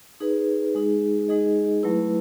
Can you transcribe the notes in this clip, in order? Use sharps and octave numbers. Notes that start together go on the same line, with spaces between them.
D#4 G#4 B4
G#3 D#4 G#4
G#3 D#4 G#4 D#5
F#3 A3 E4 B4